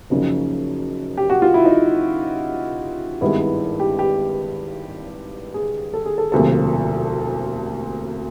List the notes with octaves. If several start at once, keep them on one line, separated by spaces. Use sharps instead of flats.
F#1 F#2 C#3 F3 D#4
G4
F#4
F4
E4
D#4
G#1 G2 D#3 G#3 B3 E4
E4
G4
G4
G#4
A4
G#4
A4
E1 D2 C3 F3 A#3 A4